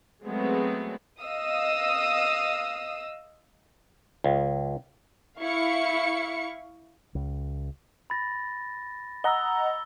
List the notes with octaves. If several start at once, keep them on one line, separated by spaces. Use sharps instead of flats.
F#3 G#3 A3 B3 C4
D#5 F5 D#6 E6
C#2
E4 F5 C#6 C#7
C#2
B5 A6 A#6
D#5 F#5 A#5 E6 G7